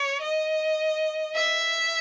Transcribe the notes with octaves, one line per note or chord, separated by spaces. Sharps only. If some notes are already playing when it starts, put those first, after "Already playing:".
Already playing: C#5
D#5
E5